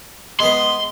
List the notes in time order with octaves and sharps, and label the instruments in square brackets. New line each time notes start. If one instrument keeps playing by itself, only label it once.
[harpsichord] G#3 B3 B4 [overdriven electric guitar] C6